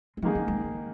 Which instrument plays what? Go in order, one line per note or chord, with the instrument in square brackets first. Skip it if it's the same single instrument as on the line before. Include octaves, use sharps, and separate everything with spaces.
[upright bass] G#3
[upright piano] G#2 D#3 A#3 D#4 G#4 [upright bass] F3
[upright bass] G#3
G#3